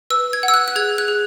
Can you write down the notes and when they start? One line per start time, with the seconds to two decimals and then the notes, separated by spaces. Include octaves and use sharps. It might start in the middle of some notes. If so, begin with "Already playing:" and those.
0.10 B4 E6
0.33 G#6
0.43 F#5
0.48 E6
0.54 F#6
0.68 F#6
0.76 G#4 G#6
0.98 F#6
1.08 G#4